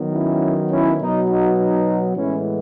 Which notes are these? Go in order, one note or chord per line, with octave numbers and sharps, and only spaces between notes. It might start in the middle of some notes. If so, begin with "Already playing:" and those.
Already playing: D#3 F#3 B3
C#4 E4
C#4 E4
B2 F#3 B3 D#4
D#4
D#4
A2 E3 G#3 B3 C#4 E4